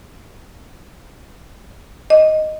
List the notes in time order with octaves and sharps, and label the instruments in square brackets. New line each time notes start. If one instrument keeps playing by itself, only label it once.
[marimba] D#5